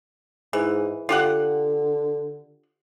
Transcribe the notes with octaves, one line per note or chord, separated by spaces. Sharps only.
G#2 E3
D3 F4 G4 F#5